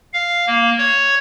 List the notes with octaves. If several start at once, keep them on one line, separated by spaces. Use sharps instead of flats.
F5
A#3
C#5